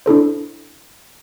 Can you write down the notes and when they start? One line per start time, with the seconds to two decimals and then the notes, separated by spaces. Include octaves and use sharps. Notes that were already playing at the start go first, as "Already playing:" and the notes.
0.06 D4 E4 A4 C5